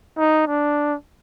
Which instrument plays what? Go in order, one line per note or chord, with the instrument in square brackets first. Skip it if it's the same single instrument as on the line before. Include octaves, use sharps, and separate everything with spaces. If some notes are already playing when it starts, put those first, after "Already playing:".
[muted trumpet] D#4
D4